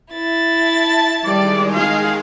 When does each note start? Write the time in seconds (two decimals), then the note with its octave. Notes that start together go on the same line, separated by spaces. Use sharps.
0.13 E4 A6
0.55 A5
1.24 D#3 G3 G#3 D5
1.73 G#4 F5